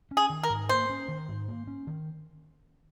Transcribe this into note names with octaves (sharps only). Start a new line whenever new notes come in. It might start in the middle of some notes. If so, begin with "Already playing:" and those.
C#4
G#4
D#3
A#4
G#2
A#3 C5
C#4
D#3
G#2
A#3
C#4
D#3